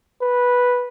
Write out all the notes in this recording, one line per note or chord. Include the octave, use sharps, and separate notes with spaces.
B4